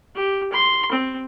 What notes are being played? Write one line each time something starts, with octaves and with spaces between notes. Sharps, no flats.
G4
C6
C4